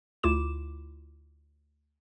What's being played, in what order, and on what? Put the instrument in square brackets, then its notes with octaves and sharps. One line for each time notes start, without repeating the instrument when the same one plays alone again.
[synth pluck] D2 E4 F4 D6 E7